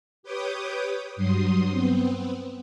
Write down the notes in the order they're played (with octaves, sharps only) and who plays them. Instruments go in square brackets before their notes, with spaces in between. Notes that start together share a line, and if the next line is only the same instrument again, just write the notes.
[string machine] G4 B4 C#5 G5 D6 D#6
G2 F#3 C6 D#6
B3 C4